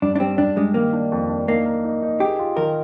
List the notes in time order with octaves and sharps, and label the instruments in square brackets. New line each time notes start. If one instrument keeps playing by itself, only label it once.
[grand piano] G2 [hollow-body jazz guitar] D4
[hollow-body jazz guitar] D4
[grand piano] G3 [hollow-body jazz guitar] C4
[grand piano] G2 [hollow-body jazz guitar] D4
[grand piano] G3 [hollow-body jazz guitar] G#3
[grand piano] D#3 [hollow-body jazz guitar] A#3
[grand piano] D4
F2
D4
[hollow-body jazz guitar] A#3 [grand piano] D#4
[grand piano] A#4
D#4
D#4
[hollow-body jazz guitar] G4 [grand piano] G#4
[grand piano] F4
[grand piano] D#3 [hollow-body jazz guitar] A#4